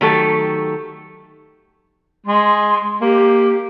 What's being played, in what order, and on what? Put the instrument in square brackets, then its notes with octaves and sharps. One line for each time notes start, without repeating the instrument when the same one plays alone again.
[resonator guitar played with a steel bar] D#3 F#3 A3 G4 A4
[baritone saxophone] G#3 [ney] C6
[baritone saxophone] A#3 [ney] G4